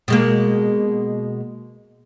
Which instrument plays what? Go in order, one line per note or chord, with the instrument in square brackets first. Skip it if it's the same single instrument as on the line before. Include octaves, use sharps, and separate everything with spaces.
[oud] B2 G#3 A#3